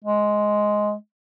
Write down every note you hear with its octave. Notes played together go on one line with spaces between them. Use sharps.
G#3